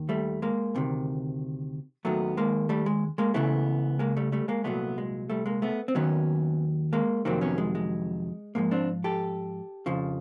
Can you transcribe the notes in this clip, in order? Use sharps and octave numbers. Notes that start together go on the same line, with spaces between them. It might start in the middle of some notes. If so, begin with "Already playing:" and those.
Already playing: D#2 D#3
G3 A3
G#3 A#3
D2 C3 D#3
D#2 D#3 F#3 A3 B3
G#3 A#3
G3 A3
G#3
G#3 A#3
C#2 C#3 E3 A3 B3
G#3 A#3
G3 A3
G3 A3
G#3 A#3
C2 A#2 F#3 A3 B3
G#3
G3 A3
G#3 A#3
A3 B3
C4
D#2 D#3 F#3 B3 C#4
G#3 A#3
F2 C3 D#3 F#3 A#3 C4
B3 C#4
G#3
G#3
G#2 F3 G#3 A#3
C4 D4
G4 A4
F2 C#3 F3